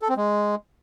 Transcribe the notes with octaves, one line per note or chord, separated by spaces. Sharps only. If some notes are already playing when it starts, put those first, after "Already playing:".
A4
C4
G#3